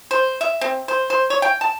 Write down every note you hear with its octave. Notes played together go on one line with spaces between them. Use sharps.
C5
E5
C4
C5
C5
C#5
G5
A5